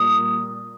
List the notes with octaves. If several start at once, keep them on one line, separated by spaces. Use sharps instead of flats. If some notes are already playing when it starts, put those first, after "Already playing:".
Already playing: A#2 G3 A#3 D#6